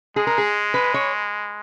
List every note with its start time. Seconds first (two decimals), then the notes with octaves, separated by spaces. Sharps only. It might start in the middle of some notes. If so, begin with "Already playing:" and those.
0.16 G#3 G#4
0.27 A#4
0.38 G#4
0.74 B4
0.94 C#5